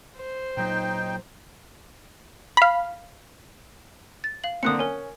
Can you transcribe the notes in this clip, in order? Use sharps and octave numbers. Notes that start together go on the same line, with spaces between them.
C5
A#2 F#3 D#4 G5
F5 B5
A6
F5 F#7
D3 A#3 C4 D#6 F#6 C#7
C#4 A#4 G#5